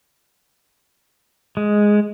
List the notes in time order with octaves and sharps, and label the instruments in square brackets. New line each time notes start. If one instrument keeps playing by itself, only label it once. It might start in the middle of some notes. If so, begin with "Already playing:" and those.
[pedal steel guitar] G#3